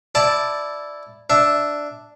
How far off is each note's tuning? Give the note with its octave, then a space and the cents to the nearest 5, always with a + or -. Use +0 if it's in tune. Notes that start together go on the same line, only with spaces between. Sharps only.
E4 +0 D5 +0 A5 -5
D4 +0 E5 +0